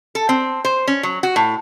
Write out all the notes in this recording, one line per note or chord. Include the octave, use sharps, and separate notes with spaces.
A4
C4
C5
C#4
F#3
F#4
A2